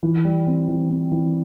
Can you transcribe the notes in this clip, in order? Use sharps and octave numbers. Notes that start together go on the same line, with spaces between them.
E3
G3
C4
E3
C4
E3